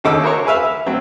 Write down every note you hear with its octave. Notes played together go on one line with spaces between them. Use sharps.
D#2 C#3 D#4 A4 D6 E6
F#4 A#4 C5 C#5
G#4 B4 E5 F5
E5
F#3 C4